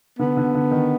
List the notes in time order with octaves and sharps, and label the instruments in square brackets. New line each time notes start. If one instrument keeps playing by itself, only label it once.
[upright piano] D3 [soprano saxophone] B3
[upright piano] D3
D3
D#3